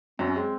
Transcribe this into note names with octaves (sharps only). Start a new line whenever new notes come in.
F#2 F#3 C4
C#4
G#3 C4